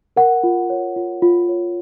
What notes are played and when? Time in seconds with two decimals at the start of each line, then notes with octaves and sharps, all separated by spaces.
0.16 A#4 F#5
0.44 F4
0.70 C#5
0.96 F4
1.22 F4
1.49 C#5